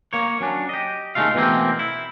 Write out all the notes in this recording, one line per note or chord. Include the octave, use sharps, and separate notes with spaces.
A#3 C#5
F#3 C#4 D4
G4 D#5
D#2 B2 G#3 A3 F4 F5
B2 E3 A3 A#3 C4
E4